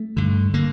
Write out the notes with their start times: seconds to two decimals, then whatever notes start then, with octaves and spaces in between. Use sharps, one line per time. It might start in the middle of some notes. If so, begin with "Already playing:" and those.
Already playing: A3
0.17 G2 D3
0.54 D3 A#3